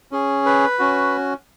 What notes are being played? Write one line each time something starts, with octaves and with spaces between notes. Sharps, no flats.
C#4 G#4
B4
C#4 F#4